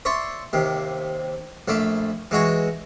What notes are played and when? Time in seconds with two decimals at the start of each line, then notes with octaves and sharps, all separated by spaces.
0.05 C#5 D5 E5 C6
0.53 D#2 C3
1.68 A#1 A3 F5 B5 D6
2.31 E3 G#3 F#4 C#5